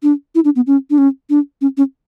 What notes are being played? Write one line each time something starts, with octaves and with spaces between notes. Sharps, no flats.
D4
E4
D4
B3
C#4
D4
C#4
D4
C#4
C#4